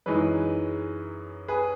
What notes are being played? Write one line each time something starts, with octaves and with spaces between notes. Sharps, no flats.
F#2 E3 G#3 D#4 G#4 B4
G#4 B4